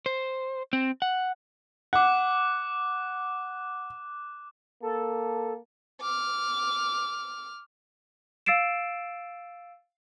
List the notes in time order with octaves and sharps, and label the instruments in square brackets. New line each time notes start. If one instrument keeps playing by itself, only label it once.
[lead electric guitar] C5
C4
F#5
[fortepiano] F#5 [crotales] D6 F#6
[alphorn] A#3 [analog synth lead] A4
[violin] D6 F6
[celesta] F5 E6 A6 C7 D7 E7